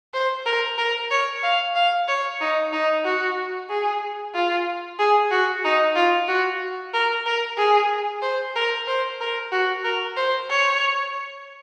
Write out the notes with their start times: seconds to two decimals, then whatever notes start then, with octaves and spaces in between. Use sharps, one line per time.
0.14 C5
0.46 A#4
0.78 A#4
1.11 C#5
1.43 F5
1.76 F5
2.08 C#5
2.41 D#4
2.73 D#4
3.04 F#4
3.70 G#4
4.34 F4
4.99 G#4
5.31 F#4
5.65 D#4
5.96 F4
6.28 F#4
6.94 A#4
7.26 A#4
7.58 G#4
8.22 C5
8.56 A#4
8.87 C5
9.21 A#4
9.52 F#4
9.84 A#4
10.17 C5
10.50 C#5